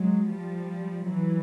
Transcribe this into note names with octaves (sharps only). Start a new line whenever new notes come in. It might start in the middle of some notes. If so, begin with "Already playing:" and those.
Already playing: F#3 G#3
F3 G3
E3 F#3